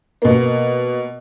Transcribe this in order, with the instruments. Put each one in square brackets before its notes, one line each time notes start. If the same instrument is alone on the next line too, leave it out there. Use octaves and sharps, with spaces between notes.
[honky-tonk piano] B2 A#3